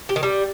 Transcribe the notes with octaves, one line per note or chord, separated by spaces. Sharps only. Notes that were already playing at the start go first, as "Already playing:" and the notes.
G4
D#3
G3